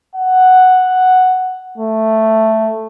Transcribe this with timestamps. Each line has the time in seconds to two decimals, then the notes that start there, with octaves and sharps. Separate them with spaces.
0.15 F#5
1.78 A3